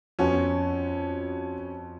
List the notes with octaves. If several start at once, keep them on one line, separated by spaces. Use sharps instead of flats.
F2 F3 B3 C#4 F#4